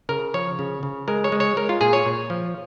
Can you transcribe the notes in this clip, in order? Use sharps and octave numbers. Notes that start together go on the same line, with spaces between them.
C#3 A#4
F3 C#5
C#3
C#3
G#3 A#4
C#5
G#3
C#5
G#3 A#4
F4
A#2 G#4
C#5
A#2
F3